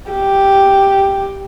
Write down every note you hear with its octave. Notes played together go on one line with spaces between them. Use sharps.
G4